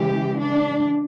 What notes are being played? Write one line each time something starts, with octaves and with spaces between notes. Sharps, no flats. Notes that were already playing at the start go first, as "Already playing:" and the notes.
Already playing: C#3 E3 G#3 G4
D4